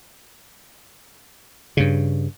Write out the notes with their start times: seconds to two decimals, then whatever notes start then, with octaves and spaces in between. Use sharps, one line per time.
1.77 G2 C#3